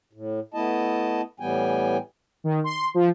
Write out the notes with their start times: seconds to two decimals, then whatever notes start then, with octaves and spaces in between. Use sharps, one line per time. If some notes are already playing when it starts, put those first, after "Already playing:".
0.13 A2
0.54 A3 B3 E4 D#5 A5
1.40 A2 E3 G3 B3 G5 G#5
2.44 D#3
2.64 C6
2.94 F3